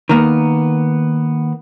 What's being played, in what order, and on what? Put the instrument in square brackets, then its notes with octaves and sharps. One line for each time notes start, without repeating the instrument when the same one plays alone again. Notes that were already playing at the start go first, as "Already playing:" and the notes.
[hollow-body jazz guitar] D#3 A#3 B3